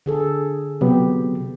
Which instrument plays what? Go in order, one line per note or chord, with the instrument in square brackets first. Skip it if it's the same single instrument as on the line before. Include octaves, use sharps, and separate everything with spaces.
[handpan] D3 G#4 A4
[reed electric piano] C3 F#3 B3 [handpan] G4